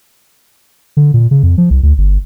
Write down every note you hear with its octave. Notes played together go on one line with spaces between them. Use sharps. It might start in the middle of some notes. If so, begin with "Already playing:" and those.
D3
A#2
C#3
F2
F3
C2
D2
G1